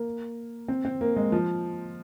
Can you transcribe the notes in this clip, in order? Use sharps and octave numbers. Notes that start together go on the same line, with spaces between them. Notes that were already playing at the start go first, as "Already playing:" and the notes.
Already playing: A#3
C4
C4
A#3
G#3
F3